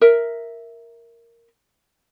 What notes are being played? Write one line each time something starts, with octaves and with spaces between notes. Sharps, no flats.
A#4 E5